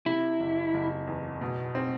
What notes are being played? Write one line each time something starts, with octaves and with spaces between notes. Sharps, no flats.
C3 E4
F#1
F#1
E2
B2
C4